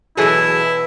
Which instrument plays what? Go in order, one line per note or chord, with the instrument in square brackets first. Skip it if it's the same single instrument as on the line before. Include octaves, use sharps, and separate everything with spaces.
[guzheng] B2 E3 [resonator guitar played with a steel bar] F#3 G#4 A4 [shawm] E4